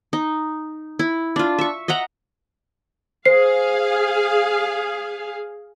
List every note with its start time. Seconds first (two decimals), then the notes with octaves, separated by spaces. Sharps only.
0.13 D#4
0.99 E4
1.36 D4 F4
1.59 E5 C#6
1.88 D#5 E5 F#5 A#5
3.25 G#4 C5 F5 C7